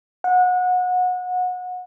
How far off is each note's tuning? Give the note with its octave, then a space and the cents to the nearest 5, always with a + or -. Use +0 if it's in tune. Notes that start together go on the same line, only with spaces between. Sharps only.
F#5 -25